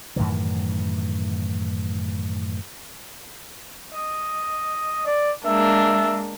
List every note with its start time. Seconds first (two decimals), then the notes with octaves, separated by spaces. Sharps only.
0.16 F#2 A2 D#3 E3
3.94 D#5
5.07 D5
5.45 G#3 A#3 D4 E5